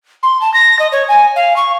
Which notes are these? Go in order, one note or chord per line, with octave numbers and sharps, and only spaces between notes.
C6
A5
A#6
D#5
C#5
G#5
F5
C#6